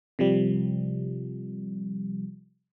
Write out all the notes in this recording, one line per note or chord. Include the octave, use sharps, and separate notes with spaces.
C3 F3 G3